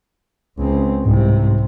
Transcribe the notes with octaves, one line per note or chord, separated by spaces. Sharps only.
C#2 C4
C2 G#2 C3